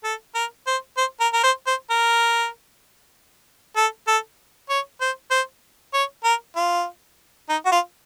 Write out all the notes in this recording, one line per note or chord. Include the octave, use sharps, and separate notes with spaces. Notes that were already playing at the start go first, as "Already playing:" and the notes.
A4
A#4
C5
C5
A#4
A#4
C5
C5
A#4
A4
A4
C#5
C5
C5
C#5
A#4
F4
D#4
F#4
F4